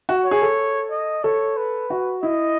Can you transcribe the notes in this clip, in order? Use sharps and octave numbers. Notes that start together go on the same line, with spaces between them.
F#4
C#5
G#4
A4
D#5
A4 C#5
B4
F#4
E4 D#5